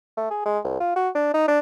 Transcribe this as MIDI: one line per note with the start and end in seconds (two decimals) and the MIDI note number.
0.17 0.29 57
0.30 0.42 68
0.46 0.59 56
0.64 0.78 36
0.80 0.93 65
0.96 1.09 66
1.15 1.32 62
1.34 1.48 63
1.48 1.59 62